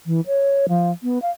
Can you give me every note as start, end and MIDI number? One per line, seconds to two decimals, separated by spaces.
0.06 0.20 52
0.27 0.66 73
0.69 0.91 53
1.03 1.21 59
1.22 1.30 77